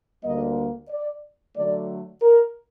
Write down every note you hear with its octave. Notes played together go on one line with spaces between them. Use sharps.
D2 D3 G3 A#3 D#5
D5
D3 F#3 A3 D5
A#4